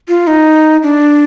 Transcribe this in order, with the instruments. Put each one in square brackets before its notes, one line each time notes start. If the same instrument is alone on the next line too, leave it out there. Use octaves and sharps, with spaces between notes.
[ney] F4
D#4
D4